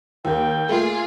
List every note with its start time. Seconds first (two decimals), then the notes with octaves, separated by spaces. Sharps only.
0.25 D#2 A#3 G5
0.69 A#2 A3 F4 G#4